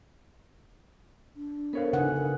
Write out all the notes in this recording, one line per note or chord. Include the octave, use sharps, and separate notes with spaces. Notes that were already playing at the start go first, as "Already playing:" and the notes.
D4
B3 A4 A#4 C5 C#5 F5
C#3 D#4 A4 B4 F#5 G#5
A#4